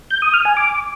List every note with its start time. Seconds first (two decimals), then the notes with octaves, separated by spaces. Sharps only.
0.11 G6
0.22 D#6
0.34 F6
0.45 G#5
0.57 D6